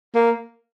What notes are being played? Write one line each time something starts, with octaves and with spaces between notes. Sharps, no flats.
A#3